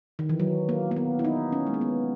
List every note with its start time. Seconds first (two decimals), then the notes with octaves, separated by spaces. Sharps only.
0.19 D#3
0.29 E3
0.40 F#3
0.69 A#3
0.91 A#3
0.96 B3
1.19 E4
1.25 D#4
1.52 C#4
1.67 G#3
1.74 A#3
1.81 B3